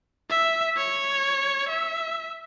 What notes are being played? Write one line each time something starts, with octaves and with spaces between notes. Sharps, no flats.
E5
C#5
E5